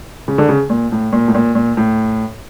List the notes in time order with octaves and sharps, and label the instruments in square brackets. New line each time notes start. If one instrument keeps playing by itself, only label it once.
[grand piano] C#3
D3
C#3
A#2
A2
A#2
A2
A#2
A#2
A2